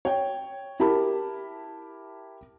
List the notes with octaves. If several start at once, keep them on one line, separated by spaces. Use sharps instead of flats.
C#5 G5
E4 G4 A#4 A5 B5